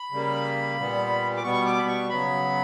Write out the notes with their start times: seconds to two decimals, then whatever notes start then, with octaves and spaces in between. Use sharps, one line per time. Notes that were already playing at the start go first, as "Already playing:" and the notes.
Already playing: B5
0.12 C#3 G3 A#3
0.78 A#2 G3 B3
1.37 D6
1.44 B2 G3 B3 C#6
1.66 D6
1.78 B5
1.88 C#6
2.10 C#3 F#3 B3 B5